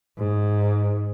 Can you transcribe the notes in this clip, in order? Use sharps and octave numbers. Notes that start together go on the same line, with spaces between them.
G#2